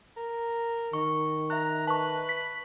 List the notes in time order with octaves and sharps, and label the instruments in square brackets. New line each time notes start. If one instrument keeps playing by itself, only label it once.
[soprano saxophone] A#4
[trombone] D#3 [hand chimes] C#6
[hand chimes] E5 F#6 [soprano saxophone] A#5
[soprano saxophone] B4 [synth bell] A5 C#6
[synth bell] B6